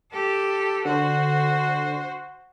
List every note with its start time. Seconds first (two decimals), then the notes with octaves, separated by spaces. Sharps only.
0.12 G4 A4
0.85 D3 F#4 C5